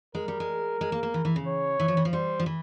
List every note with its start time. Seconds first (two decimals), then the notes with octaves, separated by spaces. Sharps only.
0.15 G#3 A#4
0.28 G3
0.40 G#3
0.81 G#3
0.92 A#3
1.03 A#3
1.14 E3
1.25 E3
1.36 C#3
1.47 C#5
1.80 E3
1.88 F3
1.97 E3
2.05 F3
2.13 G3 C5
2.40 F3
2.46 E3